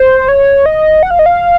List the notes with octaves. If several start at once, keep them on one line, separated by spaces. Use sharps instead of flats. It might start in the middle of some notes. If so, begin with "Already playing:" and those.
Already playing: C5
C#5
D#5
F#5
F5
D#5
F5